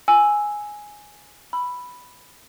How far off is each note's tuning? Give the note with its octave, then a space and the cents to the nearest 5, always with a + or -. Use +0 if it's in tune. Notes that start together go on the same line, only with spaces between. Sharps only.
G#5 +0 E6 +0
B5 +0 E6 +20